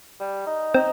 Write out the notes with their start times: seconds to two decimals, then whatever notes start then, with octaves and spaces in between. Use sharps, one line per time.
0.19 G3
0.46 D#4
0.74 C4 D#4